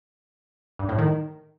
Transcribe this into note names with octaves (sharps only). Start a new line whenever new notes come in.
G2
A2
D#3